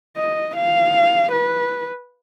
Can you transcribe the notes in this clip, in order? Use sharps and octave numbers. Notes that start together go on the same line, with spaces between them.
D#5
F5
B4